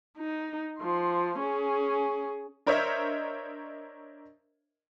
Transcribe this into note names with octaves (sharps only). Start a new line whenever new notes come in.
D#4
F3 C6
C#4 G#4
D4 A#4 C5 C#5 D#5 E5